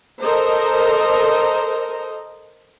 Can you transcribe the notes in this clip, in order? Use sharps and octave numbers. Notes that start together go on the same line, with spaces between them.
A4 A#4 C5 D#5 A#5